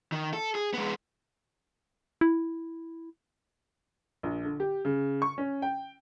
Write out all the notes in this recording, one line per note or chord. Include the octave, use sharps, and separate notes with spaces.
D#3
A4
G#4
G#3 B3
E4
A#1
D3
G4
C#3
C#6
C#4
G5